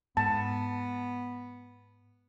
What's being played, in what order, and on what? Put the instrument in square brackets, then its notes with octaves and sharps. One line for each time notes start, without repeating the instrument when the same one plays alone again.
[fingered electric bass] G#2 [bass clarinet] B3 [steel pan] A5